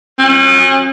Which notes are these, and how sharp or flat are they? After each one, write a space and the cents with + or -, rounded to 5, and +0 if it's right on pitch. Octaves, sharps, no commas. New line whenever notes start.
C#4 -40